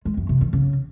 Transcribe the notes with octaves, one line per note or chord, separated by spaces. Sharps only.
G#3
F#2
C3
D#3
C#3